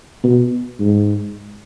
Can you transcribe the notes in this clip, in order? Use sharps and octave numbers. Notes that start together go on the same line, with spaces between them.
B2
G#2